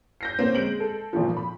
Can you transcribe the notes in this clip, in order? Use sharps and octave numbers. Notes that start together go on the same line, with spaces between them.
G6 A#6 C7
D3 A#3 C4 C#4
G#3 D7 F#7
A4
G#1 A#2 F3
B5